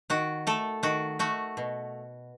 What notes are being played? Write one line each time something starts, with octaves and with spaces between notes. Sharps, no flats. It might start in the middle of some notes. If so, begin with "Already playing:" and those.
D#3 F#4
A3 A4
D#3 F#4
A3 F#4
B2